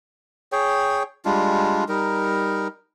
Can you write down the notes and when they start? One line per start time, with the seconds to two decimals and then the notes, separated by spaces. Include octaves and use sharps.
0.52 G#4 C#5 G5
1.25 G3 G#3 D4 F4
1.89 G3 D#4 A#4